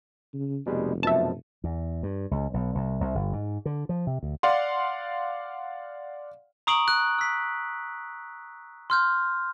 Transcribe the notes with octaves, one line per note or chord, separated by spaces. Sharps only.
C#3
F1 B2 G3 G#3
F#2 B2 F3 E5 A5
E2
G2
C#2
B1
C2
C2
G1
G#2
D3
F3
C3
D2
D5 F5 F#5 C6
A#5 C#6 D#6 C7 D7 F#7
F#6
E6 B6
C6 F6 G6